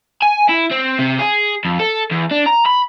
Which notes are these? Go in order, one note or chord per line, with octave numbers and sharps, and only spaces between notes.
G#5
E4
C4
C3
G#4
F2
A4
E2
D4
A#5
B5